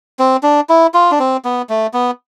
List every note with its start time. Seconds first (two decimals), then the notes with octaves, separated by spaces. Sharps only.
0.19 C4
0.43 D4
0.69 E4
0.94 F4
1.11 D4
1.19 C4
1.45 B3
1.69 A3
1.94 B3